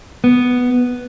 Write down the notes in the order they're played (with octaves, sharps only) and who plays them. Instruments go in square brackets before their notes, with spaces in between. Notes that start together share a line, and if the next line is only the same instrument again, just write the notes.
[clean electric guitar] B3